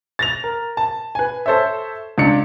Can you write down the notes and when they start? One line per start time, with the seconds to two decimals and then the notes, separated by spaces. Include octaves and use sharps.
0.19 A6 A#6 F7
0.44 A#4
0.77 A5
1.15 B4 G#5
1.46 A4 C5 C#5 E5
2.18 C#2 D4 C#7